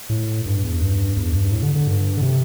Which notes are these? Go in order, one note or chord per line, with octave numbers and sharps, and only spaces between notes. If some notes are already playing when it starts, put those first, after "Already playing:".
A2
G2
E2
G2
E2
G2
A2
D3
D3
G2
D3
C3